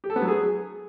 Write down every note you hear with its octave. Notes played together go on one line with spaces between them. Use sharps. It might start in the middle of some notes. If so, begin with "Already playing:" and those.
G4
A4
B3
F#3
G#4